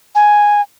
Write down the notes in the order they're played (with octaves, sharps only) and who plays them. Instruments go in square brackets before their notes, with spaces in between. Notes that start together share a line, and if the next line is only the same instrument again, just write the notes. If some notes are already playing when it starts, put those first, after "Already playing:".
[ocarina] G#5